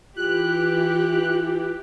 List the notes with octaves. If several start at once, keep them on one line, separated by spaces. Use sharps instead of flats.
E3 F4 G4 F#6